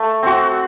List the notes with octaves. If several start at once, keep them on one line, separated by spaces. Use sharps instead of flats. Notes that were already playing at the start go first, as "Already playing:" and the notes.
Already playing: A3
C4 F#4